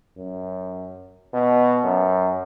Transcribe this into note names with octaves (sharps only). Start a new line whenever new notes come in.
F#2
B2
F#2